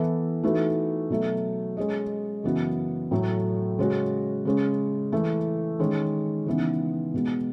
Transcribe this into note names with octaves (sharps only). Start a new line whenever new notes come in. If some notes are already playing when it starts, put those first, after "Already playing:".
Already playing: E3 B3 E4 A4 E5
E3 A3 D#4 F#4 B4
B2 F#3 A3
G#3 C#4 G#4 D#5
F#2 C#3 E3 B3 F#4
A2 F#3 A3
C#3 G#3 C#4 F#4
C#3 G#3 C#4
E3 A3 E4 A4
D#3 G#3 C#4
C#3 E3 B3 D#4
B2 G#3 B3